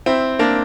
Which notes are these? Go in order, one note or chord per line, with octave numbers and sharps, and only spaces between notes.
C4 E4
A#3 D4